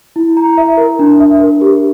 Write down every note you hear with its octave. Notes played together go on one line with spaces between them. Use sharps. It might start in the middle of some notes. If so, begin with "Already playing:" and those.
E4
A#5
E5
A#4
D4
E5
A#4
G4